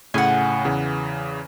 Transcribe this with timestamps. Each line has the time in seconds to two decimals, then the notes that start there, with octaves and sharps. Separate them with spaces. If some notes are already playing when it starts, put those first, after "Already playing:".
0.14 A2 C#3 F#5 G#5
0.65 E2 C#3 E3